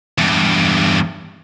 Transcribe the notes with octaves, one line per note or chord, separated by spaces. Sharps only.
E2 G2